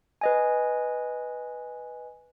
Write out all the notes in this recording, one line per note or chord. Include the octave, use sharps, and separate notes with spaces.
B4 D#5 G#5